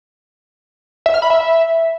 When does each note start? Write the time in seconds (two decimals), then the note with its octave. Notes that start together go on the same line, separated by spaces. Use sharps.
1.06 E5
1.14 F6
1.22 B5
1.30 E5